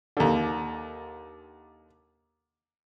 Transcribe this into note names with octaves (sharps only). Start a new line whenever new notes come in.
D#2 D3